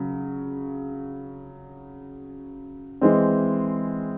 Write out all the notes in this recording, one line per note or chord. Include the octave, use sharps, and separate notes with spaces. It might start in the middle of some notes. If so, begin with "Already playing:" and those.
Already playing: C#3 F#3
E3 G#3 C4